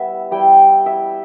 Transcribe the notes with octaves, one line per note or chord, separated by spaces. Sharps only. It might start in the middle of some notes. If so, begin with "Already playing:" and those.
Already playing: G3 B3 E4 E5
G3 E4 G5
E5